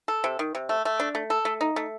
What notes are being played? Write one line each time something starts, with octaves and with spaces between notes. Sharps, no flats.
A4
C3
D#3
C3
A3
A3
D4
A3
A4
A3
D#4
A3